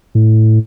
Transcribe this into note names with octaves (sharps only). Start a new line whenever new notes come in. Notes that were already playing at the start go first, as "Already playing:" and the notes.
A2